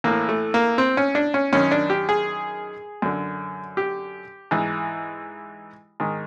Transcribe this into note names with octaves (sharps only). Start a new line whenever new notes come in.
A2 E3 A#3
A3
A#3
C4
C#4
D4
C#4
F#2 D#3 C#4
D4
G4
G#4
F#2 D3
G4
G#2 E3
G#2 D#3